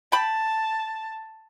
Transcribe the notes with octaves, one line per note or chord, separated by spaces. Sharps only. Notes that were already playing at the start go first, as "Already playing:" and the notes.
G5 A5 B5